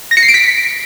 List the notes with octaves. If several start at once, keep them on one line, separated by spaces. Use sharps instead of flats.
A#6
C#7
C7
D7
B6